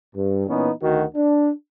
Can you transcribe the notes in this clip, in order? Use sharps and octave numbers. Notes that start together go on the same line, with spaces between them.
G2
A#2 E3 B3 C#4 D#4
D2 D#3 F#4
D4